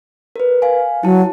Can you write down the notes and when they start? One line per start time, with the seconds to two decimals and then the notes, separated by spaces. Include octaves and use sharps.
0.36 A#4 B4
0.62 F5 G#5
1.03 F#3 E4 A5